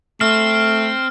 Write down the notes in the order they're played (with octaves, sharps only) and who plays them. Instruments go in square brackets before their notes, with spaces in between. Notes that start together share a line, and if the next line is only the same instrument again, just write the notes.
[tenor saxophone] A3 [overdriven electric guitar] C4 [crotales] F6